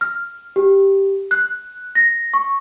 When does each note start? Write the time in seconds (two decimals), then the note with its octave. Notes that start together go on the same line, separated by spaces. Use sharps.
0.01 F6
0.56 G4
1.31 F#6
1.95 A#6
2.34 C#6